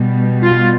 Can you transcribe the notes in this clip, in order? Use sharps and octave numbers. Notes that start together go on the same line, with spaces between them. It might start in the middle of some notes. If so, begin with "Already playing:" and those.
Already playing: B2 G3
F4